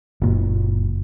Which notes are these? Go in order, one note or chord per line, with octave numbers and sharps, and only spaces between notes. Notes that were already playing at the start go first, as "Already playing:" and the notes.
F#1 A#2